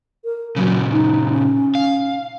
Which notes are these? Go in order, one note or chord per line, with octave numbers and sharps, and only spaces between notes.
A#4
A#2 C#3 F#3
D#4
C#4
F5